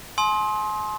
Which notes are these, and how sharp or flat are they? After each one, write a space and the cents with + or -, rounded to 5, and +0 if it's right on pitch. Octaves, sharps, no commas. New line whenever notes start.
G#5 +40 C6 +15 D#6 +40